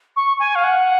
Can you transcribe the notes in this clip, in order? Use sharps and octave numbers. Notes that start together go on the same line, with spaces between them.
C#6
G#5
F5
F#5